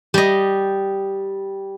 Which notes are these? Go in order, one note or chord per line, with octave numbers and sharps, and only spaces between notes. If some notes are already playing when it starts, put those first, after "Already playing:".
G3 D#5